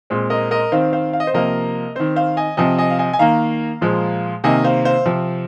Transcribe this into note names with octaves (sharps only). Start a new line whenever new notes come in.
A#2 G#3 C4
A#4 D#5
A#4 D#5
D#3 C4 C5 F5
C5 F5
F5
D#5
C5
C3 F3 A#3 A#4 D#5
D#3 C4 C5
C5 F5
D#5 G#5
C3 F3 C4 D#5 G#5
D#5 G#5
F5
D#5 G#5
G#5
D#3 A#3 F5 A#5
A#2 F3 G#3
C3 D#3 A#3 D#5 G#5
C5 F5
C5 F5
C3 F3 C4